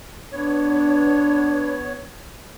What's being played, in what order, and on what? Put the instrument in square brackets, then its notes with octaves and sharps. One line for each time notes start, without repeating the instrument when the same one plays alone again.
[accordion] B3 C#5 [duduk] D4